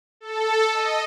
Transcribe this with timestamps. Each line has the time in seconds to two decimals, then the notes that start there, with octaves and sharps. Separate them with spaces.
0.21 A4
0.73 D#5